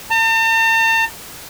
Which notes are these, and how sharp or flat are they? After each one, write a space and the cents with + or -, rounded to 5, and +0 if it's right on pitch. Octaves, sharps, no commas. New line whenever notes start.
A5 +45